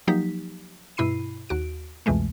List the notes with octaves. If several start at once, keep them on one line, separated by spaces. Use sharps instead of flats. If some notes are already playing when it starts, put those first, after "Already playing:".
F3 F#3 A#3 D#4 G4 B6
G2 B2 E4 B5 C7 D#7
D#2 F#4 D7
C2 F2 B2 E3 G#3 A3